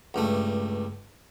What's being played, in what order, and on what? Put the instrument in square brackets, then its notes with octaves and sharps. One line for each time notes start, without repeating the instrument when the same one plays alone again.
[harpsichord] C#2 G2 A3